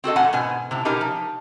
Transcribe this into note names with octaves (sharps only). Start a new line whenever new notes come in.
C4 F#4 A4 D#5
E2 A#2 A3 F#5 G#5
G#2 B2 G#5
A2 C3
B2 D#4 G4 A#4 G#5 A#5
F3